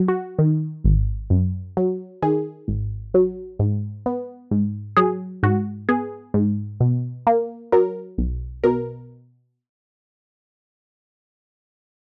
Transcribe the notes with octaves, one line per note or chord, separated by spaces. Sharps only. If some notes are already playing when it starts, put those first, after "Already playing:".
Already playing: F#3
F#4
D#3
G#1
F#2
F#3
D#3 G#4
G#1
F#3
G#2
B3
G#2
F#3 G#4
G#2 F#4
B3 G#4
G#2
B2
A#3
F#3 A#4
B1
B2 A#4